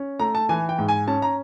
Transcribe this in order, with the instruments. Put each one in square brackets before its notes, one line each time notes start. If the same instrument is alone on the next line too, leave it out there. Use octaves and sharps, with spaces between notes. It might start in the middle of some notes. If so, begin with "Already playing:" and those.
Already playing: [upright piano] C#4
A3 A#5
A5
E3 G#5
G5
G#2
G#5
C#4 A5
A#5